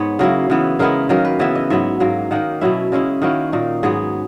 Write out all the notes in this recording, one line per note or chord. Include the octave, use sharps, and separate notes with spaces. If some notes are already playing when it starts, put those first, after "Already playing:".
Already playing: G#2 B3 C#5
C#3 F#3 A#3 E4
C#3 E3 B3
C#3 G#3 B3 E4 A#4
D#3 F#3 A#3 C#4 A#4
B4
C#3 E3 B3 E4 E5
D#5
G#2 F#3 B3 E5
G#2 F#3 A#3
D#3 A#3 D#4 F#5
B2 F#3 C#4 E4 E5
C#3 G#3 C#4 E4
D#3 A#3 C#4 E4 F#4
A#2 A#3 D#4
G#2 F#3 B3 G#4